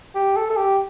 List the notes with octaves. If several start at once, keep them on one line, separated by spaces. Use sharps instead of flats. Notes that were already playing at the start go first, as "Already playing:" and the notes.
G4
A4
A4
G4